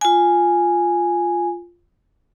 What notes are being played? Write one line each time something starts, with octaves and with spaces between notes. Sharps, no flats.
F4 G#5